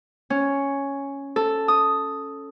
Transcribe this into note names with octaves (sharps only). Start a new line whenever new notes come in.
C#4
A4
D#6